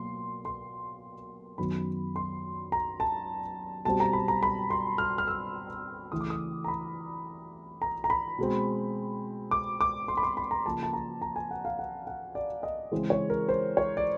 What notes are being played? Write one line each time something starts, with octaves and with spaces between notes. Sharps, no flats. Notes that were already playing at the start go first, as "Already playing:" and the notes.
Already playing: B2 F#3 A#3 C6
C6
F#2 D#3 F#3 B3 B5
C6
A#5
A5
B2 G3 C4 A5
A#5
B5
A#5
B5
C6
F6
F6
E6
C#3 E3 A3 D#6
D6
D#6
A#5
B5
A#5
A#5
B5
B2 G#3 C4
D6
D6
C6
B5
C6
B5
A#5
C#3 F3 A#3 A5
A5
A#5
A#5
G#5
F#5
F5
F#5
F#5
D5
D#5
C#3 E3 G#3 C4
C#5
A#4
C5
C#5
D5